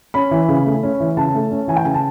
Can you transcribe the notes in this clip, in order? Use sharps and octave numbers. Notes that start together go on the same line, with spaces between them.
C#4 B5
E3
C#3
A3
C#4
E3
C#3 A5
A3
C#4
E3 G#5
G5
C#3 G#5
A5